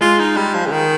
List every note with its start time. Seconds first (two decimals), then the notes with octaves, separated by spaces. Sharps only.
0.01 G#3 F4
0.19 D#4
0.37 G3
0.54 F3
0.66 C#3
0.72 D#3